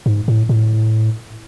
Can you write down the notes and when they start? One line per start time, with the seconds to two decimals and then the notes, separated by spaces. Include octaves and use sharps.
0.06 G#2
0.28 A2
0.49 A2